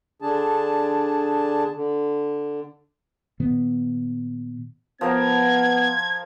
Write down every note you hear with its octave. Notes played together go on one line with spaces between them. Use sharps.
D3 D4 G#4 A5
D3
A#2 D#3 B3
F3 B3 A#4 G5 G#6